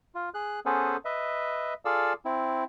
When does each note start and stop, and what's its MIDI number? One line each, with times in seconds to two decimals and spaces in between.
0.15 0.29 65
0.34 0.60 68
0.34 0.60 90
0.66 0.97 59
0.66 0.97 61
0.66 0.97 68
0.66 0.97 69
0.66 0.97 71
0.66 0.97 72
1.05 1.74 71
1.05 1.74 75
1.05 1.74 76
1.85 2.13 65
1.85 2.13 68
1.85 2.13 69
1.85 2.13 74
1.85 2.13 77
1.85 2.13 88
2.25 2.64 60
2.25 2.64 64